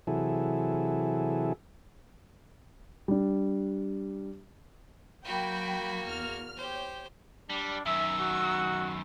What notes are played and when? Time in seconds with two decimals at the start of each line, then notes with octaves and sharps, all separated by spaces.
0.07 C3 E3 F#3 E4 G#4 A4
3.08 G3 D4
5.25 F#3 A#3 F#4 G5 B5
6.05 E2 F6
6.56 G4 C5 C#5
7.50 G3 D4
7.86 F#2 D#3 E5 E6
8.21 F#4